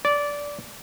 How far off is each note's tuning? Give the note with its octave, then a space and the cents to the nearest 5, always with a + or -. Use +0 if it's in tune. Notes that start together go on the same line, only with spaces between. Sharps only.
D5 -15